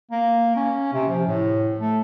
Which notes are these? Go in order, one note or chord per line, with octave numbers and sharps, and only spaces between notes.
A#3
C#4
C3
F3
A2
A3